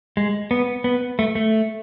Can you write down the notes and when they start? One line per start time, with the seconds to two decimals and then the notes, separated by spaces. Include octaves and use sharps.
0.17 G#3
0.51 B3
0.84 B3
1.19 A3
1.35 A3